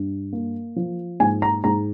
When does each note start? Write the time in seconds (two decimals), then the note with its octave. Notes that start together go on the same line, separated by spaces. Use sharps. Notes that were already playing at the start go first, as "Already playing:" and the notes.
Already playing: G2
0.33 A#3
0.76 F3
1.20 G#2 G#5
1.42 A#5
1.64 G#2 A#5